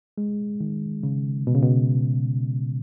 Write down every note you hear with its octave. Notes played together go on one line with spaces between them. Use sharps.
G#3
D#3
C#3
B2
C#3
B2